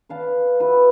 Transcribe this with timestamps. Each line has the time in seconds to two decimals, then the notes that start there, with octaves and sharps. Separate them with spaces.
0.09 B4 F5 A5
0.60 E4 F#4 B4